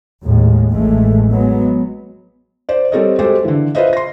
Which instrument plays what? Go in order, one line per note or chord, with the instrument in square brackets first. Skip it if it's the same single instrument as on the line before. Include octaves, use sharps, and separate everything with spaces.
[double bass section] D#2 A2 G#3
A1 E3 G#3 A3
F#3 G#3 B3
[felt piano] C5 D5
G3 C4 A4 A#4 C#5 D#5
G#3 F#4 G4 A4 C5
D3 E3
F4 B4 C5 D#5 E5
C6 A#6